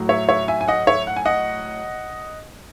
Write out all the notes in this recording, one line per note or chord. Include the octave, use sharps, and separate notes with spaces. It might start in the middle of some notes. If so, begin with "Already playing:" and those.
Already playing: A2 F#3
C#5 E5
C#5 E5
E5 G#5
G#5
D#5 F#5
C#5 E5
F#5
G#5
D#5 F#5